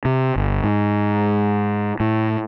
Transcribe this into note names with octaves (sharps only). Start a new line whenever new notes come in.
C3
G1
G#2
A2